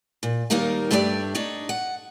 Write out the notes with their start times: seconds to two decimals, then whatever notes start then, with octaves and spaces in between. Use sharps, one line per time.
0.23 A#2
0.50 D#2 G3 A#3 D#4 A#4 F5
0.91 G2 A3 D4 G4 B4 D5
1.35 D4 D#4 C#5
1.69 F#5